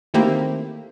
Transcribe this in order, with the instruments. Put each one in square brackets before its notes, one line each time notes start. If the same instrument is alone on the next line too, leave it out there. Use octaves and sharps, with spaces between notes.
[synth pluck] D#3 A3 A#3 C4 E4 G4